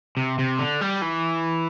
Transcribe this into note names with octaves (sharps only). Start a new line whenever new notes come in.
C3
C3
D3
G3
E3